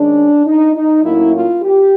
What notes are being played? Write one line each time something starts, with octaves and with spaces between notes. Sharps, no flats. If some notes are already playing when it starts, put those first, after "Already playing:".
Already playing: D#3 G#3 C#4 D4
D#4
D#4
A2 F#3 A#3 C#4 E4
F4
G4